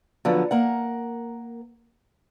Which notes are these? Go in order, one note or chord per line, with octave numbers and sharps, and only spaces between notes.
D3 F3 F#3 B3
A#3 A#4 F#5